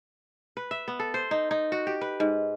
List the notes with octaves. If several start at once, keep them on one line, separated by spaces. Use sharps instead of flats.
B4
E5
B3
A4
C5
D#4
D#4
F#4
G4
B4
G#2